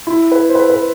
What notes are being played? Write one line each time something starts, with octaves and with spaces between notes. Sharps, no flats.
E4
B4
C5
B4
B4